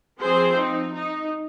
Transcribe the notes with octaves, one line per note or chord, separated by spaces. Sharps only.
F3 C4 G#4 C5
D#4
D#4